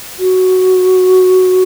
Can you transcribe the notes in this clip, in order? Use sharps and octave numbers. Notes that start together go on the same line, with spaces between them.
F#4